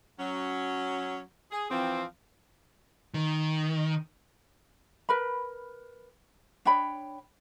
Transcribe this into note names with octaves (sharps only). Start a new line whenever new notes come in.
F#3 C#4
G#4
E3 F3 C4
D#3
A#4 B4 B5
D4 C#5 G5 B5